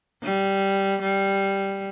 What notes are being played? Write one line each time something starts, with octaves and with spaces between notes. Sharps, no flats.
G3
G3